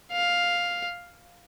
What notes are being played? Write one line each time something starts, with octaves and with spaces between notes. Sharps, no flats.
F5